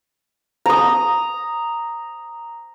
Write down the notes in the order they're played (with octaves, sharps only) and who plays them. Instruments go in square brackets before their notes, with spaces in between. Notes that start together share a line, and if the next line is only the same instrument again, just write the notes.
[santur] A#5 D#6